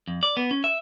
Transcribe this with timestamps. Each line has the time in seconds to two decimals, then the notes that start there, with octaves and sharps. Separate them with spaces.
0.08 F2
0.23 D5
0.37 B3
0.51 C#4
0.64 E5